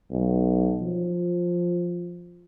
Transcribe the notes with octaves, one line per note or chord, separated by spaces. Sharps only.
B1
F3